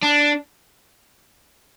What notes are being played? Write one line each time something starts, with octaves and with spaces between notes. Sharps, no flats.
D4